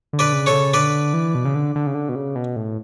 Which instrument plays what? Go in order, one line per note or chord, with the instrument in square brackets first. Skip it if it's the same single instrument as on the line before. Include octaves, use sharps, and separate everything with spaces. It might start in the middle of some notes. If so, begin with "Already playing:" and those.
[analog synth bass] D3
[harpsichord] B4 D5
[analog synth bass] C#3
[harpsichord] A4 C#5
[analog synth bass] C#3
[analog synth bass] D3 [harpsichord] B4 D5
[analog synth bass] E3
B2
C#3
D3
D3
C#3
D3
B2
C#3
B2
A2